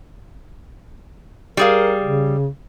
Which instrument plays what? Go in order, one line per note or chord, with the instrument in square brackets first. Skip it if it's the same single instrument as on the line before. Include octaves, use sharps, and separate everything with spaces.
[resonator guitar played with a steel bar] G3 G#4 F5 [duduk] A#4
[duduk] C#3